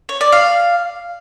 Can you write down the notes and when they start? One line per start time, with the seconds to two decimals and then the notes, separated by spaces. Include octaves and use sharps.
0.09 C#5
0.21 D5
0.32 F5